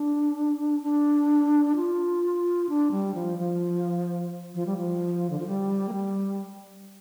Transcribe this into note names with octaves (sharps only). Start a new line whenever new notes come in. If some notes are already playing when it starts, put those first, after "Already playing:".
Already playing: D4
D4
F4
D4
G3
F3
F3
F3
G3
F3
D3
F3
G3
A#3
G3